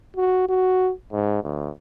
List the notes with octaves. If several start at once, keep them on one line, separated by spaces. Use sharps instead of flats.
F#4
F#4
G#2
D2